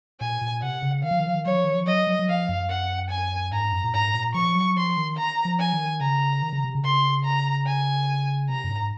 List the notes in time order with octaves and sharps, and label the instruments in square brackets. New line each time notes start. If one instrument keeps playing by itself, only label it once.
[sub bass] A#2 [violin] G#5
[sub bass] A#2
[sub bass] C3 [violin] F#5
[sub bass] C#3
[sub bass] D#3 [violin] F5
[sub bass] F3
D#3
F3
D#3
[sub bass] F#3 [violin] C#5
[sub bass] F3
D#3
F3
[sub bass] F#3 [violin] D#5
[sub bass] F#3
F#3
[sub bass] F3 [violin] F5
[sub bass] F#2
[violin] F#5
G#5
[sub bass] G#2 [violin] A#5
[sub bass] F#2
A#2
[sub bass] G#2 [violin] A#5
[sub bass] A#2
[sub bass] F3 [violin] C#6
[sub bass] F#3
[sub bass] F3 [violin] C6
[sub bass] D#3
[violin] A#5
[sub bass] F3
[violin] G#5
[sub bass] D#3
[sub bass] C#3 [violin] A#5
[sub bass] D#3
C#3
C3
C#3
[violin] C6
A#5
G#5
[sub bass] C3 [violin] A#5
[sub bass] F#2
G#2